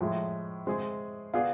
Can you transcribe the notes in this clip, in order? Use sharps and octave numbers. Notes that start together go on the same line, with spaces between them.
A2 F3 G#3
G#3 C4 G#4
B3 F4 G#4 D5